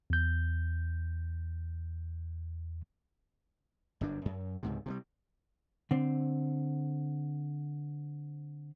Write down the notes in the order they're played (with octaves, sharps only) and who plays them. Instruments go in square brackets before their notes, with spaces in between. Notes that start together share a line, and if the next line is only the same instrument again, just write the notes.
[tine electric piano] E2 G6
[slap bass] G1 F#2 D4
F#2
C#2 G#2 C3
C3 F3 G3
[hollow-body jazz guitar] D3 C4